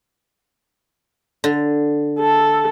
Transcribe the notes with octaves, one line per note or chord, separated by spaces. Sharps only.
D3
A4